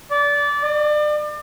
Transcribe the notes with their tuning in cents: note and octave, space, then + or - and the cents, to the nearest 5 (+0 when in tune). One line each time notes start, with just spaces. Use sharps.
D5 -20
D5 +35